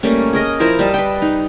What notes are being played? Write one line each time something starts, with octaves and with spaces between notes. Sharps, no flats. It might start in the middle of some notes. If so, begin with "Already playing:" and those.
G3 A3 A#3 C#4
G#4 A#4 D#5
F3 E4 A#4 C5
G3 D#5 A5
B4 G5
D#4